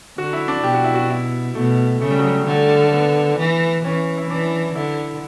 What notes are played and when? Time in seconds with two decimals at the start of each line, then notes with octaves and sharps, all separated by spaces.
0.18 D3 F#4
0.33 E4
0.48 D4
0.64 B2 G4
0.74 F#4
0.84 E4
0.94 F#4
1.10 E4
1.55 B2 A3
2.01 C#3 A3
2.10 G3
2.19 F#3
2.27 G3
2.46 D3 A3
2.87 A3
2.92 B3
3.39 E3
3.85 E3 C#4
4.17 E4
4.30 E3 D4
4.75 D3 E4